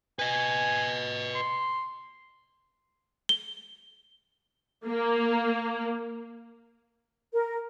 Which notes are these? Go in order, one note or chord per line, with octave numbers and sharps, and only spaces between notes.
B4 D#5 G#5
C6
G7
A#3
A#4